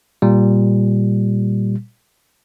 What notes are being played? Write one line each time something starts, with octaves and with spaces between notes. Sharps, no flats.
A#2 G3